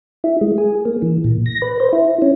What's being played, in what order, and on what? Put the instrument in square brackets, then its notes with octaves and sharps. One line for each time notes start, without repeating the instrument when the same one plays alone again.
[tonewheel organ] E4
G#3
G#4
A#3
E3
A#2
A#6
B4
C5
E4
C#4